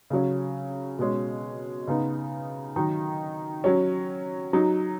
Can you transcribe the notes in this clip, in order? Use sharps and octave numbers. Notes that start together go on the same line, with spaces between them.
C#3 F#3 C#4
B2 G#3 C#4
C#3 B3 D#4
D#3 F#3 D#4
F#3 C#4
F#3 D#4